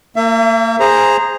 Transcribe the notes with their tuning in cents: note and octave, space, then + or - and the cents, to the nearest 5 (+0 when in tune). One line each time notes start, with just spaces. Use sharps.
A#3 -30 E5 +35
G#4 -15 C5 +0 A#5 +0